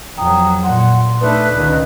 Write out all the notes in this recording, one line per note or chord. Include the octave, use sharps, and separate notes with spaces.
F2 F#3 G5 A#5 D#6
A#2 F#5 C6
A3 D4 D#4 B4
C#2 D#3